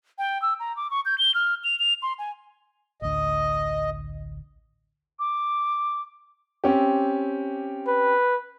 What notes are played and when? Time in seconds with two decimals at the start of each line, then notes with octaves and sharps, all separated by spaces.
0.18 G5
0.42 E6
0.60 A#5
0.77 D6
0.91 C#6
1.06 G6
1.18 G7
1.35 F6
1.64 F7
1.79 F7
2.02 C6
2.19 G#5
3.02 A1 D2 D#5
5.19 D6
6.64 C4 C#4 G4
7.87 B4